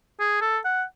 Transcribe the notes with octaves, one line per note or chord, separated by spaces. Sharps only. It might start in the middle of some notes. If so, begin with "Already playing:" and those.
G#4
A4
F#5